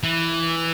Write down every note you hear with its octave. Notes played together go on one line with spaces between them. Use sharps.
E3